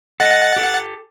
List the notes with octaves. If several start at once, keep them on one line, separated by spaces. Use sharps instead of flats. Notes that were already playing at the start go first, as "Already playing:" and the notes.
A4 D#5 F#5 A6
G4 A4